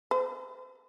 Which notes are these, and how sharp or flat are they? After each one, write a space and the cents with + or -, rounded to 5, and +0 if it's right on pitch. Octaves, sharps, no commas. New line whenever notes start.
C5 -35